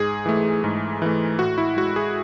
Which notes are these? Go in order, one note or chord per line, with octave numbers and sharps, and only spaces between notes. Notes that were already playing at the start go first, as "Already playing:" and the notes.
Already playing: G#2 G#4
E3 A3
G#2
E3 A3
A2 F#4
E4
G#3 F#4
G#4